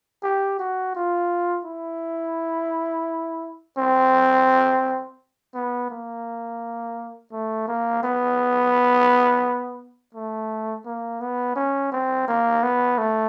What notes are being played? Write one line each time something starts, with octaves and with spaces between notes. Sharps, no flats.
G4
F#4
F4
E4
C4
B3
A#3
A3
A#3
B3
A3
A#3
B3
C#4
C4
A#3
B3
A3